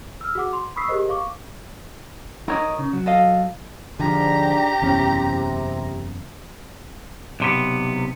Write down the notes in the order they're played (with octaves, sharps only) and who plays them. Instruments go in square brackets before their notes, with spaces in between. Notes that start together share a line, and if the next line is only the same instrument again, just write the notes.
[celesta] E6 F6
F#4 G#4 F#5 D6
C6
B5 C#6 D#6 E6 B6 C7
G4 G#4 A#4 C5 D#5
F5 C#6 D6
[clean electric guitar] D#4 C#5 D#5 [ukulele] A#4
[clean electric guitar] C#3
F#3
[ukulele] A4 D#5 F5
[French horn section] G#2 D4 [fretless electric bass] D3 F3 [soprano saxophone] G4 [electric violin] A#5
[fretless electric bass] F#1 E2 C#4 [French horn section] C3
[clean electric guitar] B1 C3 B3